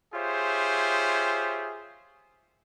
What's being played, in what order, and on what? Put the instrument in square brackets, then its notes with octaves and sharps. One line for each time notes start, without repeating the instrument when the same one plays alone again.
[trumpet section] F4 G4 G#4 C5 C#5 E5